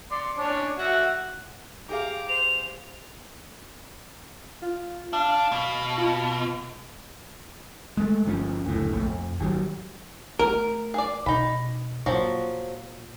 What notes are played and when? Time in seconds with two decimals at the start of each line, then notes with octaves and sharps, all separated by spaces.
0.11 D5 C6
0.37 C#4 D4 C#5
0.78 F#4 E5 F#5
1.89 G4 G#4 F5 A#5 D6
2.29 C5 F7
4.62 F4
5.13 D4 F5
5.52 B2
5.98 F4
7.97 G#3 A3
8.25 G1 F3 C#4
8.65 F#1 D2 A2
8.91 E1 A#1 A3
9.07 F2
9.40 G#1 D#3 F#3 G3
10.39 A3 A#4
10.94 G#4 D5
11.26 B2 D#4 B5
12.06 A#2 F3 F#3